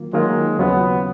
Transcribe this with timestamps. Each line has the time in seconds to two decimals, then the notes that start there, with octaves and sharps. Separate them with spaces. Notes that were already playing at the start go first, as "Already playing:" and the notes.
Already playing: D#3 F#3 A#3 F4
0.13 D#3 F#3 G#3 A#3 F4
0.59 D#2 C#3 F#3 B3 C#4 F4